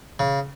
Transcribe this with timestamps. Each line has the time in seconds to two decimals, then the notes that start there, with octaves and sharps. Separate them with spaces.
0.19 C#3